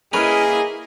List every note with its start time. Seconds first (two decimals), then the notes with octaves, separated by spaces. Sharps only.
0.13 A#3 C#4 E4 G#4 A#4 B4 D#5